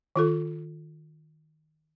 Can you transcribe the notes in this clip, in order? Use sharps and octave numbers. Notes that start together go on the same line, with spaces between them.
D#3 F4 A4